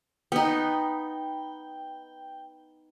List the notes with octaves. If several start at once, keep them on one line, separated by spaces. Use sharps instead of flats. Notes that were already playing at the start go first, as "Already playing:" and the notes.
B3 D#4 G5